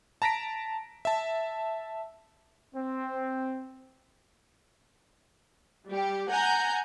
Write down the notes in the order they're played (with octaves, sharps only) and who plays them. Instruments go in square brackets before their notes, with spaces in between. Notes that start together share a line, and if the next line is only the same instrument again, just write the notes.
[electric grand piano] A5 A#5 A#6 B6 D7
E5 A5
[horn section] C4
[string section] G3 G4
F#5 G#5 A#5 G6